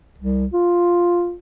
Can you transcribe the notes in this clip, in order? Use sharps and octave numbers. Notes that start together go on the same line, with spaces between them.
C2
F4